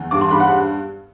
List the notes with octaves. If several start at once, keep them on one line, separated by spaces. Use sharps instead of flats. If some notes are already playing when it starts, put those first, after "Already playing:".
Already playing: E2
G2 D6
C6
G2 B5
F#5